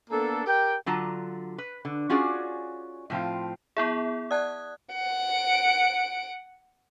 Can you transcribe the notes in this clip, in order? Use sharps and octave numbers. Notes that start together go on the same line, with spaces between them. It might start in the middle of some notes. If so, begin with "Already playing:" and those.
A#3 B3 D4 A4
G4 A#4 G5
D3 F#3 F4 A5 A#5
B4
D3
C#4 F4 F#4 G#4 D5
A2 F3 C4 F4
B3 E4 G#4 E5 C#6
D5 F#5 A5 D#6 F#6 G#6
F#5 D7